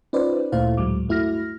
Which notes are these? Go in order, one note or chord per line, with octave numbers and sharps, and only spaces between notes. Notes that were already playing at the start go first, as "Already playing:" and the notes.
C#4 D#4 F4 B4 C5 D5
D2 A#2 A3 E4 C5 F5
D2 A2 F#3 G#3 D6
G2 A3 E4 F#4 F6 A#6